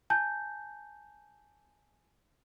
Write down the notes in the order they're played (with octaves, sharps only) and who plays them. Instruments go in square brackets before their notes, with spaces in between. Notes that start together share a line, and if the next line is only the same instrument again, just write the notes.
[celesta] G#5 A5 G6